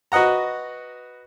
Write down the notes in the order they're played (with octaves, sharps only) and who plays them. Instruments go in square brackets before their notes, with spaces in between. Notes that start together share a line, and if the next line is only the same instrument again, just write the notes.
[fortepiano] F#4 B4 D#5 F#5 A#5